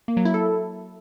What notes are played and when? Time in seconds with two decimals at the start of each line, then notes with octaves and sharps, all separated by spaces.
0.08 A#3
0.17 F#3
0.25 E4
0.34 A4